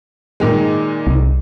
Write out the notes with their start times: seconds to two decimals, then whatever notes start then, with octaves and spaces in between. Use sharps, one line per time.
0.40 A#2 D#3 G#3
1.07 C2